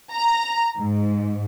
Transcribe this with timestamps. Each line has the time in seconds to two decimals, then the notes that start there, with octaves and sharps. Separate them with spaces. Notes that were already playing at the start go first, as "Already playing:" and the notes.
0.14 A#5
0.79 G#2